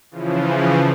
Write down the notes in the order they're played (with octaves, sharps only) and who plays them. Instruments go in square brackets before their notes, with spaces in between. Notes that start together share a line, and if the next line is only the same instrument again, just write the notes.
[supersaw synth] C#3 E3 F3